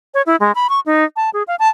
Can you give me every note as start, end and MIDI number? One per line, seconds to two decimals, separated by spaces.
0.14 0.22 73
0.26 0.36 64
0.40 0.52 56
0.55 0.67 83
0.69 0.80 85
0.86 1.04 63
1.16 1.30 81
1.34 1.43 68
1.48 1.56 77
1.59 1.69 81